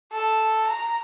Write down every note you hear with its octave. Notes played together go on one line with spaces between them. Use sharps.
A4
A#5